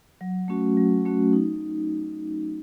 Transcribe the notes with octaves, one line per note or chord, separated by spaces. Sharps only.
F#3
A3 C#4 F#4
F#3
A3 C#4 F#4
D#4